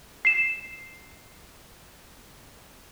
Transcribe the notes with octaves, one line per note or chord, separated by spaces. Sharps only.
C7 E7